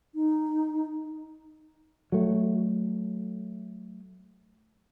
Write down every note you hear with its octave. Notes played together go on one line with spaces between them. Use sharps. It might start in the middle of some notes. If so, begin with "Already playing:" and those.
D#4
F#3 A3